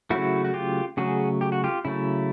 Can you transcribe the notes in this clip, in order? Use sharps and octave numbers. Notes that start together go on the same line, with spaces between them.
C#3 F#3 A3 E4 F#4
F#4
F4 G4
C#3 F#3 A3 F#4 G#4
G4
F#4
F4 G4
C#3 F#3 A3 E4